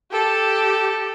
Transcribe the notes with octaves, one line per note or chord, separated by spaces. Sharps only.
G4 A4